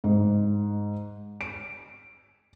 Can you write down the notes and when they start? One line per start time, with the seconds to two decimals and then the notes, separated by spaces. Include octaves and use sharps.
0.04 G#2
1.41 D7